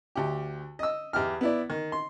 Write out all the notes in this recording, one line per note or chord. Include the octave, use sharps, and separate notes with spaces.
D2 G4
D#5 E6
E2 G4 F6
B3 E4 D5
D#3
C6